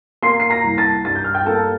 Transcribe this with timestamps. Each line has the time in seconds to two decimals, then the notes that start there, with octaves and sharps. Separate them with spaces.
0.22 A#3 C6 C7
0.40 C7
0.50 A#5 A#6
0.64 C2
0.78 A5 A6
1.05 G2 A6
1.15 G6
1.24 F6
1.34 G5 G6
1.46 A#3 A4 A5